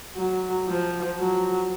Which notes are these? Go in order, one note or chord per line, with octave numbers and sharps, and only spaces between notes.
F#3
F3
F#3